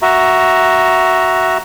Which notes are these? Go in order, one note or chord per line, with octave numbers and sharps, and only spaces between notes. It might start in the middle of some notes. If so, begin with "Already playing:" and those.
F#4 E5 A#5